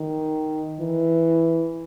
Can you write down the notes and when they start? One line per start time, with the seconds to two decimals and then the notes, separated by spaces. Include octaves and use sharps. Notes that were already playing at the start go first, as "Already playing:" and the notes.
Already playing: D#3
0.80 E3